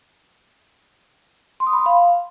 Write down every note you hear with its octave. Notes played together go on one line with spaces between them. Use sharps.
C6
D#6
B5
C6
F5